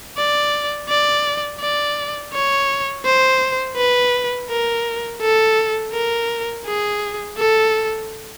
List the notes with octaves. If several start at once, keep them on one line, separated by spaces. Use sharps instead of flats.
D5
D5
D5
C#5
C5
B4
A#4
A4
A#4
G#4
A4